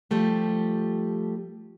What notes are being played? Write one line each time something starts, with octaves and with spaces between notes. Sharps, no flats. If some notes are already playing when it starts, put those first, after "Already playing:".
F3 G3 A3 G4